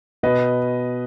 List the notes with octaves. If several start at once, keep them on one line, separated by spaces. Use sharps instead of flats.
B2 B4 D#5